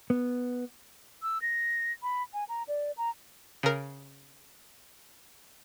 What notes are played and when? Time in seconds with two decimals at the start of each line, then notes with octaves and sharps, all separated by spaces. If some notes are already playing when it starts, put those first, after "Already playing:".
0.10 B3
1.23 E6
1.42 A#6
2.03 B5
2.34 G#5
2.49 A#5
2.68 D5
2.97 A#5
3.63 C#3 A#4